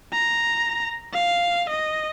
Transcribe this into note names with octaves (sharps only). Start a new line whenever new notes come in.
A#5
F5
D#5